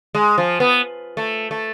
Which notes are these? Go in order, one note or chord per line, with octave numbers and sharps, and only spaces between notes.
G#3
F3
B3
A3
A3